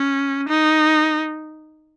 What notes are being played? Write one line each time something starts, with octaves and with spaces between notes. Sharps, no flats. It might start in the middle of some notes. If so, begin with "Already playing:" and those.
Already playing: C#4
D#4